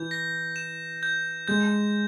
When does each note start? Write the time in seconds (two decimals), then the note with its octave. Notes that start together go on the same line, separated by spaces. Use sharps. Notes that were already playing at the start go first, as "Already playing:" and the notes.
Already playing: E3 G6
0.11 A#6
0.56 E7
1.03 G6
1.48 G#3 G6